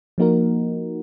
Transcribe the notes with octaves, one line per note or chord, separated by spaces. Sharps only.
F3 A#3 D#4 F#4 A#4